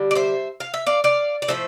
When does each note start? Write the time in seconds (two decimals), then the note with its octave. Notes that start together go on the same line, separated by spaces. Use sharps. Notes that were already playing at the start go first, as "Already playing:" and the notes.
Already playing: D3 G3
0.11 D5
0.15 C5 E5
0.60 F5
0.74 E5
0.87 D5 F5
1.04 D5 F5
1.42 D5
1.48 A2 F3 A3 C5 E5